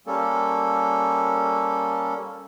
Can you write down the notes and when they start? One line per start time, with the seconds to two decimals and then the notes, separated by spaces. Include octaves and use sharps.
0.07 G3 A#3 C#4 A4